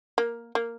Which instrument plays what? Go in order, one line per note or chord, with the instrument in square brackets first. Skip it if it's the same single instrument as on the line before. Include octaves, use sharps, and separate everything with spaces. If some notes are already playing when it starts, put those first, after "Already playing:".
[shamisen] A#3
A#3